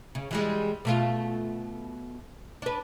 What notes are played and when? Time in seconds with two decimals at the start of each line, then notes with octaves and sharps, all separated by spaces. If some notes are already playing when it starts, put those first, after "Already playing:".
0.15 C#3
0.31 E3 G3 G#3
0.85 B2 A3 F4
2.62 D4 B4